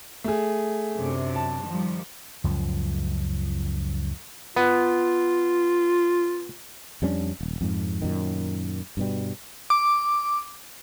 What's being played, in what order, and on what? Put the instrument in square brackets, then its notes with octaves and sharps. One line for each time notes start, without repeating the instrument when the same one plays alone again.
[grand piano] A3 G#4
[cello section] F#2 C3 D4
[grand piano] A5
[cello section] D#3 F3 G3
[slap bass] C#2 F#2 F3
[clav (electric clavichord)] B3 [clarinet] F4
[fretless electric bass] F2 G3 C#4 D4
D#1
F2 G#2
F#2 A#2 D#3
G2 B2 G3
[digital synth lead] D6